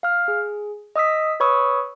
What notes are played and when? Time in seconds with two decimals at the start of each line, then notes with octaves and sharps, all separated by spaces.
0.03 F5 F6
0.28 G#4
0.96 D#5 D#6 E6 B6
1.40 B4 C#5 B5 C#6 D#6 E6